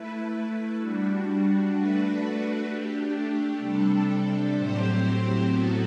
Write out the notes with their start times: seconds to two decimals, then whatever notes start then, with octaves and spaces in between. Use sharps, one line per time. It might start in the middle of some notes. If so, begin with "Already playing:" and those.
Already playing: A3 E4 B4
0.77 G3 D4 F#4
1.71 A3 D4 F#4 B4
2.66 A3 D4 G4
3.59 C3 G3 D4 A4
4.54 A2 F#3 C4 G4 C5
5.48 A2 F#3 B3 F#4 A4